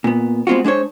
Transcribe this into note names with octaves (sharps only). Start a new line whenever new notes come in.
A#2 B3
G#3 B3 C4 F4 F#4
G#3 D4 C5 C#5